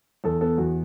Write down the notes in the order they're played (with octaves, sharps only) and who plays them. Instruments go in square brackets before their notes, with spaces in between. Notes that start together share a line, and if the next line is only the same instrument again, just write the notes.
[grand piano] E2 A4
B3 A4
E2 F#4